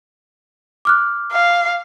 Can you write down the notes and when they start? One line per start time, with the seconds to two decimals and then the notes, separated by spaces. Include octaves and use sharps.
0.85 D6 F6 F#6
1.32 F5